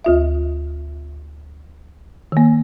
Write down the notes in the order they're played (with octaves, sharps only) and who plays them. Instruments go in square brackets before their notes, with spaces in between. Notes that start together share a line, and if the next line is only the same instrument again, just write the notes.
[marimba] D2 F4 E5
D#3 A#3